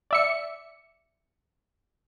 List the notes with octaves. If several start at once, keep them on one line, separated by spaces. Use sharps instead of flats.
D5 E5 C#7